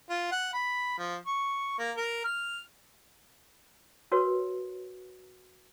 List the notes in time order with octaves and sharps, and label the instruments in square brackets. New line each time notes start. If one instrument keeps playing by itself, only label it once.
[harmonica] F4
F#5
B5
F3
C#6
A#3
A#4
F6
[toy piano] F#4 A#4 B4 C#5